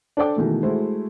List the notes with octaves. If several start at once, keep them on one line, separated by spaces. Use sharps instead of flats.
D4 A4 C5 D5 G5 D6
B2 D#3 E3 G#3 A3
G#3 A3 E4 F#4 C5